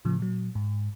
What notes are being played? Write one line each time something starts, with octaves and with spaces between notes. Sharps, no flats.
A2 C#3 F3
A#2 F#3
G#2